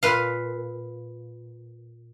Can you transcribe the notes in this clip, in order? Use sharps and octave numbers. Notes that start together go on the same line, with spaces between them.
A#2 B4 F5